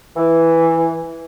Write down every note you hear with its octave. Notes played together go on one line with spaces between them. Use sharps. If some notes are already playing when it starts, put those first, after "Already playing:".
E3